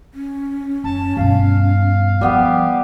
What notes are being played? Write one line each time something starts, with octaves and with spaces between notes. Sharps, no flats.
C#4
F#2 A5
G2 B2 F5
F3 G3 B3 G4